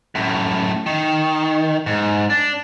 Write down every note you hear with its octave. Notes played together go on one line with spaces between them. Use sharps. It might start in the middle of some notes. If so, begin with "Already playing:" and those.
F#2 A2
D#3
G#2
D4